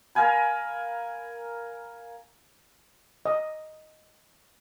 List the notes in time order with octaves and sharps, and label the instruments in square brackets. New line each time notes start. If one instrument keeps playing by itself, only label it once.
[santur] A#4 F5 G#5 B5
[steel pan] D#5